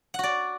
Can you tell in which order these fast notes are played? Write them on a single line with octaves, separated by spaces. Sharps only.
F#5 F#4 D5